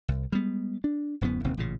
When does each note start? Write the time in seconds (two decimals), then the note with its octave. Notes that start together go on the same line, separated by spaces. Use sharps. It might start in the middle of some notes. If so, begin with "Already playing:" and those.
0.08 C2
0.32 G3 G#3 B3
0.84 D4
1.21 D1 F#2 A2 B3
1.44 E1 D#2 C3 C4
1.57 A1 A#2 C#3